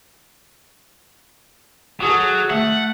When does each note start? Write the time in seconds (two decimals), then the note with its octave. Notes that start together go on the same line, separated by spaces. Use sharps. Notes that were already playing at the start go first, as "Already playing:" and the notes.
2.01 F#3 F#4 G#4 A4
2.50 A3 F#5